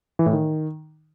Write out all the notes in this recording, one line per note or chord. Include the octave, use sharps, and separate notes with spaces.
E3
A2
D#3